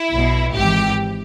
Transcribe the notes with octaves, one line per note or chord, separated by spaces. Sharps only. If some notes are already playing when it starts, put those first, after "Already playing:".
Already playing: E4
B1 B2
G#1 G#2 E3 G4